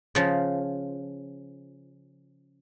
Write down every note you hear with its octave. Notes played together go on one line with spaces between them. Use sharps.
C#3 F3